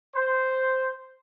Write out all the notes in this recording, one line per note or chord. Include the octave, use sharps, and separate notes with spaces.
C5